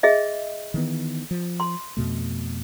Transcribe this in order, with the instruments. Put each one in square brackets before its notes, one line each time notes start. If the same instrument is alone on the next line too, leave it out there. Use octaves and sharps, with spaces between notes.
[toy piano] G#4 D#5 E5
[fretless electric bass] D#3 E3 B3
F3
[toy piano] C6
[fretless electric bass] F2 B2 A3